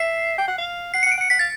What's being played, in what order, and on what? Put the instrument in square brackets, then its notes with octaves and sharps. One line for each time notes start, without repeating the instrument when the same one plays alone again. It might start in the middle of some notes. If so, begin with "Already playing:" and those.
Already playing: [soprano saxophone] E5 [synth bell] C7
[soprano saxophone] G5
F#5
F5
[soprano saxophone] F#5 [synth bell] C7
[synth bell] C#7
[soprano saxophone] F#5
[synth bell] D7
[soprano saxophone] F#5 [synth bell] C#7
[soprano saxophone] F#5 [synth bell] B6
[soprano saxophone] F5 [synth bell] A6